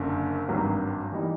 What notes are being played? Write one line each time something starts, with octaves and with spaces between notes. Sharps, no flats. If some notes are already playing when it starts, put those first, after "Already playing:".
Already playing: F#1 F#2 D3
G#1 G2 D#3 F#3 A#3
E3 G3 A#3 D#4